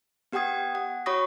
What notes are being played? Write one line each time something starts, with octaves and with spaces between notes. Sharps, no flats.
B3 G4 F#5 G5 D#6 G#6
F#5
F#4 C#5 B5 C#6 D#6 A#6